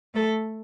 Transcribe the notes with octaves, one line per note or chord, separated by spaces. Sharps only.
A3 A4